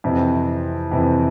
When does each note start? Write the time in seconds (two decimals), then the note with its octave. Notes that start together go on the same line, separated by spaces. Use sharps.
0.04 F2 C3 E3
0.91 F2 C3 E3